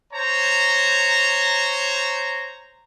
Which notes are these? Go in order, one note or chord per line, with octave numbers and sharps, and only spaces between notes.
C5 C#5 A#5